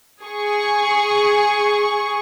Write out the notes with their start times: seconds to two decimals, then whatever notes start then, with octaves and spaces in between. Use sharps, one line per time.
0.24 G#4 C#6